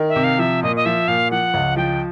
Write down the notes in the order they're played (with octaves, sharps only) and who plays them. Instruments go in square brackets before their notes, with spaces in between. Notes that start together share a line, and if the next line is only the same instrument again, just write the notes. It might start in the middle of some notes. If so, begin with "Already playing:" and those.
Already playing: [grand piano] D#3
[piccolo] E5
[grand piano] C3
[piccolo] F5
[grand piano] F3 [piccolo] E5
[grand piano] A#2 [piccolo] D#5
[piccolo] D#5
[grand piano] F3 [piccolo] E5
[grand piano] A#2 [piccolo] F5
[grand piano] F3 [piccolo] F#5
[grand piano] C#2
[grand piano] F3 [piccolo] G5